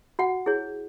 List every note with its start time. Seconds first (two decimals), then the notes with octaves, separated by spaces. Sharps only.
0.19 F#4 F#5
0.46 E4 G#4 C#5